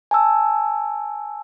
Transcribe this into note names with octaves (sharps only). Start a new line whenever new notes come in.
G#5 A5 E6